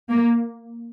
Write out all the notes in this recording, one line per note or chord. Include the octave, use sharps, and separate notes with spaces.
A#3